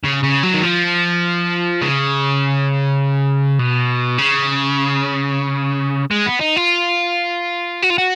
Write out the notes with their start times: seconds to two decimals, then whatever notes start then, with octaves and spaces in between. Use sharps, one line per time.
0.04 C#3
0.23 C#3
0.43 F#3
0.54 D#3
0.63 F3
1.81 C#3
3.59 B2
4.18 C#3
6.11 G#3
6.26 B3
6.40 D#4
6.56 F4
7.83 F#4
7.90 F4
7.98 F#4